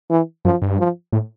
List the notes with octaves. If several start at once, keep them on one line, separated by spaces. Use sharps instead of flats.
E3
F#2 F3
G2
F3
A2